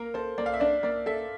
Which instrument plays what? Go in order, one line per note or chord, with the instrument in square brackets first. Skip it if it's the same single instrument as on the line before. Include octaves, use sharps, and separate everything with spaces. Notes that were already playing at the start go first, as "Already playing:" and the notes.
Already playing: [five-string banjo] A#3 [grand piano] A#4
[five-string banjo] A4 [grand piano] C5
[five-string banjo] A#3 [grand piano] D5
[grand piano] F5
E5
[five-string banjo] D4 [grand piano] D5
[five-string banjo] A#3 [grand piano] D5
[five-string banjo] A4 [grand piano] E5